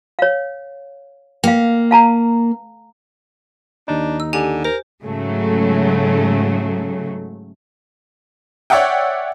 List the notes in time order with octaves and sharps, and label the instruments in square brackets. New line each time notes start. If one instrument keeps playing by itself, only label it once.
[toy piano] C#5 F5
[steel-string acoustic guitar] A#3 [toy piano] F5 G5
[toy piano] F5 A5 A#5
[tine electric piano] D#2 D#4 [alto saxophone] D4
[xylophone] E6
[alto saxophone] D3 [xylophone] G4 G#5 F7
[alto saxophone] A#4 [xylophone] C5
[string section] G#2 C#3 F#3 A3
[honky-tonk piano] C#5 D5 E5 F#5 G5